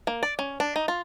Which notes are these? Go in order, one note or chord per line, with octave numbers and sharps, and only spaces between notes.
A#3
D5
C#4
D4
D#4
F4